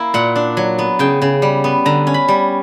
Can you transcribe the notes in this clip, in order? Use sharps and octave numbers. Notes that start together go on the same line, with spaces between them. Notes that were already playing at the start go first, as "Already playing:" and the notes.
Already playing: A#3 E4
A#2 F#5
D4
F#3
B3
C#3 G5
C#3
G3
B3
D3 A#5
C#4
B5
G3